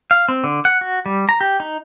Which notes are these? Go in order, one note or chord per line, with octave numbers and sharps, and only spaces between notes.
F5
C4
D3
F#5
F#4
G3
A#5
G4
D#4